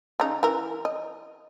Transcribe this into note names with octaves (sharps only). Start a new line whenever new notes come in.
C#3 D#4
E3 A#4
D#5